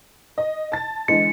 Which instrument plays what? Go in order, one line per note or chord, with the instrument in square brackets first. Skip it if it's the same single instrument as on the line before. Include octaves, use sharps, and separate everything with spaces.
[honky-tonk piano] D#5
A5 A6
[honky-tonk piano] D3 E3 G#3 [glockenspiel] C#7